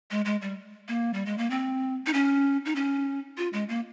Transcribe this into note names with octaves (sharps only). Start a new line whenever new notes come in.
G#3
G#3
G3
A#3
G3
G#3
A#3
C4
D#4
C#4
D#4
C#4
F4
G#3
A#3